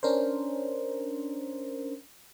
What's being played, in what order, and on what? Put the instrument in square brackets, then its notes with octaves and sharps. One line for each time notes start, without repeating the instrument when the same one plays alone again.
[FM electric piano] C#4 D4 A#4 C5